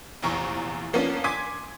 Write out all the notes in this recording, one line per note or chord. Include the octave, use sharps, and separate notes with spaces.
F1 A#1 E2 A#5 C#6
F3 A#3 B3 C#4 D4
G#5 C6 D6 G#6 B6